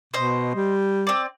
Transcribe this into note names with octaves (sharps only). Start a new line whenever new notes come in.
B2 C5 D#5
G3
C4 D5